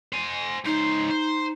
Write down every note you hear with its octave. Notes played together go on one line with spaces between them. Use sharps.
C5 G#5
C#2 D#4 C5
C5